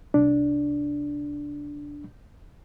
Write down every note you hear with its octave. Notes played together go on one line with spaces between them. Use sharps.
C2 D4